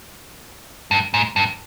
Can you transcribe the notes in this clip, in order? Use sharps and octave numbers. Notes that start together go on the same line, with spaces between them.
G2
G#2
G2